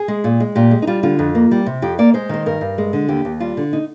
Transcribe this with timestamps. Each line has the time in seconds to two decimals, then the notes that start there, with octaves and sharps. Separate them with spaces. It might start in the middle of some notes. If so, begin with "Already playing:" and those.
Already playing: G#4
0.08 G#3
0.24 A#2
0.40 G#3
0.55 A#2 G4
0.71 G#3
0.82 D#4
0.87 G3 F4
1.03 D3 F4
1.19 F2
1.35 A#3
1.51 G3
1.66 C3
1.82 F2 G4
1.99 A#3 D5
2.14 G#3 C5
2.29 D#3 C5
2.46 G2 A#4
2.61 G2
2.78 G#3
2.93 D3
3.08 D#2 G4
3.25 D#2
3.40 G3 F4
3.57 D3
3.73 D#4